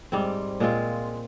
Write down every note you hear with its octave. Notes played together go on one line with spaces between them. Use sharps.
G#2 G3 C4
A#2 G#3 C4 F4